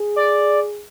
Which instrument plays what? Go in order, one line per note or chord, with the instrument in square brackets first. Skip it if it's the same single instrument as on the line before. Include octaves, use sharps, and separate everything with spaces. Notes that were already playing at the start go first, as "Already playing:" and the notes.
Already playing: [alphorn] G#4
[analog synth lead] D5